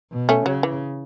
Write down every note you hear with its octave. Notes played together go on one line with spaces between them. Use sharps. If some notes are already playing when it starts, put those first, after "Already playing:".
B2
A3 C#4
C#3 F#3
E3